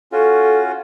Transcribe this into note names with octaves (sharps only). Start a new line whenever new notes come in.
C#4 F4 F#4 A4